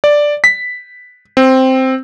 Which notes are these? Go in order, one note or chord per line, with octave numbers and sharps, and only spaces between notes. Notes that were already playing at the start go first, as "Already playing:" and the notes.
D5
B6
C4